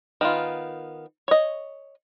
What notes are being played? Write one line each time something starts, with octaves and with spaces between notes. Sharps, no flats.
D#3 B3 F4
C#5 D#5